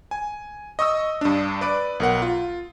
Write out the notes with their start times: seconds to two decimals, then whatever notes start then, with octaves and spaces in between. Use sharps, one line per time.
0.11 G#5
0.79 D#5 C#6 D#6 E6
1.21 G2 D4
1.61 B4 D5 D7
2.00 B1 A#4 F#5
2.22 F4